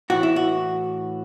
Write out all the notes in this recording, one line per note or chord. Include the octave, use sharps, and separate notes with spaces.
A2 E3 F#4
E4
F#4